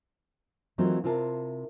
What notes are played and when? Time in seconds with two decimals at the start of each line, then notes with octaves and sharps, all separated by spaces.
0.78 D#3 E3 F#3 A3 C4 F4
1.04 C3 E4 F4 A#4 A5